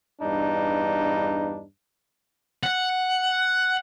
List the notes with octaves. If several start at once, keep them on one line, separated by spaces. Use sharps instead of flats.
E2 G2 D4 D#4
F#5